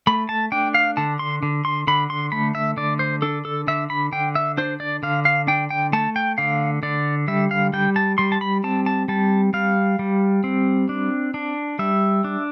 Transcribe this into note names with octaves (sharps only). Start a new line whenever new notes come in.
A3 B5
A5
D4 G5
F5
D3 A5
C6
D3
C6
D3 B5
C6
A3 B5
E5
D3 D5
C5
D4 A4
A4
D3 E5
B5
D3 G5
E5
D4 C5
D5
D3 F5
F5
D4 G5
G5
A3 A5
G5
D3 F5
D3 D5
G3 E5
F5
G3 G5
A5
G3 C6
A5
B5
C4 A5
A5
G3 A5
G3 F5
G3
C4
D4
D4
G3 E5
D4